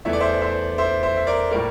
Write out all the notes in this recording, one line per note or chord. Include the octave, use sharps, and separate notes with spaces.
E2 E3 A3 E5
D5
C5 E5
C5 E5
C5 E5
C5 E5
E5
A#4 D5
A2 G3 A#3 A#4 D5